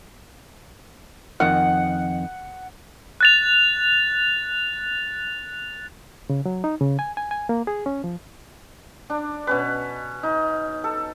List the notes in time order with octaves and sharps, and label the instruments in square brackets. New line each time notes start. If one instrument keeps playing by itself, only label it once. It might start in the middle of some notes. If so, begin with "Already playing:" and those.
[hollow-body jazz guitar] F2 D#3 [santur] F#5
[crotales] F#6 A6 F7
[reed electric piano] C#3
F#3
D#4
C#3
G#5
G#5
G#5
A#3
G#4
C#4
F3
[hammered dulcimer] D4
B2 C#4 B4
D#4
A4